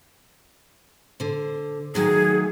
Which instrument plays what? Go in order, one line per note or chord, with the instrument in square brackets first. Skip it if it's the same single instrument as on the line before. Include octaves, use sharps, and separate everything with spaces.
[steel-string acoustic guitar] D3 C5
[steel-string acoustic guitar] D#3 F#3 A3 [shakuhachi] G#4